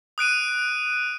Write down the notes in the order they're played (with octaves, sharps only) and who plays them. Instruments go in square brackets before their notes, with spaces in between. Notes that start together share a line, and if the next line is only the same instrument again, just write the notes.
[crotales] D#6 F#6 D7 D#7